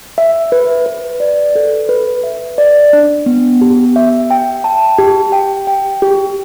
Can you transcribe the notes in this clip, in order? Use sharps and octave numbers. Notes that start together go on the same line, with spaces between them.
E5
B4
B4
D5
A4
B4
E5
D5
D4
B3
G4
E5
G5
A5
G4
G5
G5
G4